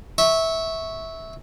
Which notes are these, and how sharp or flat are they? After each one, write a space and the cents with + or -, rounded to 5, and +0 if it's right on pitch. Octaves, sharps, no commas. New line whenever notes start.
E5 -15 C#6 +0